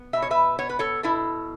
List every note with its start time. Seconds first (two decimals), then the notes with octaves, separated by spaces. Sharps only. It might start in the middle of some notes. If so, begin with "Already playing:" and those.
Already playing: B3
0.13 B2 E5
0.22 C#5
0.30 B4 E5
0.59 B3 C#5
0.69 B4
0.79 A4 C#5
1.03 B2 E4 A4